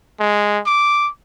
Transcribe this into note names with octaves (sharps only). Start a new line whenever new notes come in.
G#3
D6